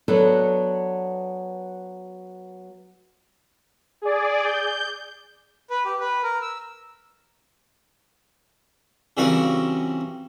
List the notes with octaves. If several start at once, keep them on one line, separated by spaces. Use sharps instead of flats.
F#3 B3 D4 A4 B4
G#4 D5
G6
B4
G4
B4
A#4
E6
C#3 E3 G3 C4 F#4 A#4